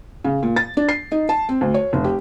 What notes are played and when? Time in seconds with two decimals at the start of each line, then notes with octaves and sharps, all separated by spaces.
0.24 C#3
0.43 A#2
0.56 A6
0.77 D4
0.89 C7
1.12 D#4
1.29 A5
1.49 C4
1.61 D2
1.74 C#5
1.93 F1
2.04 G4